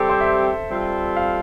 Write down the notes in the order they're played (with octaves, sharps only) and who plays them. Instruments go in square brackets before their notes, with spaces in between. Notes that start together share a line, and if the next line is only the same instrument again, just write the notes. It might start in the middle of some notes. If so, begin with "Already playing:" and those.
Already playing: [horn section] G3 C4 G4 [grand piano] A4
[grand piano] C5
E5
[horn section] G3 C4 F4 A4
[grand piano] F5